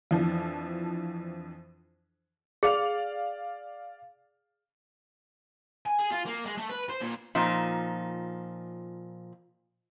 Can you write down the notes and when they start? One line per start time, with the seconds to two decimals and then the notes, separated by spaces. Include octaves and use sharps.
0.11 F2 E3 F3 D4
2.63 G#4 D5 F5 F7
5.86 G#5
5.99 G#4
6.11 F4
6.26 A#3
6.46 G#3
6.57 A3
6.70 B4
6.89 C5
7.01 A#2
7.35 A#2 F3 D#4